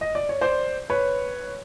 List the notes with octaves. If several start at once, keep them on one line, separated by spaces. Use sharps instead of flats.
D#5
D5
C#5
C5 D5
B4 C#5